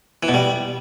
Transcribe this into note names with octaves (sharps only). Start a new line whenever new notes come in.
E3
B2
G3